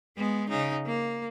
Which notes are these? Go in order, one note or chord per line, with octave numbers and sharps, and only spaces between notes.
G#3 B3
C#3 D#4
A#3